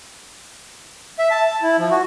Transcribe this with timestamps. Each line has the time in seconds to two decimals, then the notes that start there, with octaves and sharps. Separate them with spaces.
1.19 E5
1.31 A5
1.47 A5
1.62 E4
1.78 F3
1.91 F#4